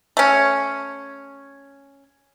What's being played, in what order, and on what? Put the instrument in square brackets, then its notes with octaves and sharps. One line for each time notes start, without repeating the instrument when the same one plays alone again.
[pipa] A3 C#4